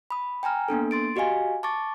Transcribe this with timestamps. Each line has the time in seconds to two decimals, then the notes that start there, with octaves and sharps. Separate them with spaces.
0.10 B5 D#6
0.43 G5 G#5 A#5 F6
0.68 A#3 B3 D4 A4
0.91 C6 A6 D7
1.16 F#4 G4 D#5 F5 G#5
1.63 A5 C#6 D6 A6